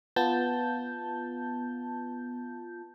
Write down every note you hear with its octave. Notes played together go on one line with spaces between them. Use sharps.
B3 F4 A5 G6